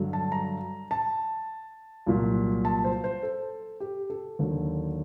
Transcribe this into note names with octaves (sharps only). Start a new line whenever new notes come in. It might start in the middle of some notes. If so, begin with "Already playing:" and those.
Already playing: G2 D3 F#3
A5
A#5
A5
C2 A#2 F#3
A5
C5
C5
A4
G4
A4
D#2 D3 F#3